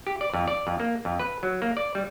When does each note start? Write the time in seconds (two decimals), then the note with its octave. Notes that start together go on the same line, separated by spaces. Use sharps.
0.07 G4
0.21 D5
0.34 F2
0.48 D5
0.67 F2
0.80 A#3
1.05 F2
1.19 B4
1.43 F#3
1.62 A#3
1.77 D5
1.95 G3